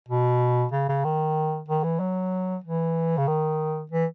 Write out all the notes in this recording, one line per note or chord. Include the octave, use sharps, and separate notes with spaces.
B2
C#3
C#3
D#3
D#3
E3
F#3
E3
C#3
D#3
E3